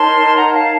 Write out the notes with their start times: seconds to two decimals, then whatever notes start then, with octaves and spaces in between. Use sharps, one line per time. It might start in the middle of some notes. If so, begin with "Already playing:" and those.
Already playing: D#4 A#4 C#5 A5 C6
0.36 F#5 A#5
0.53 F5 A5